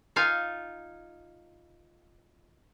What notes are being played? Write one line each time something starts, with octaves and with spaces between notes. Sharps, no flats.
D#4 F4 F5 G#5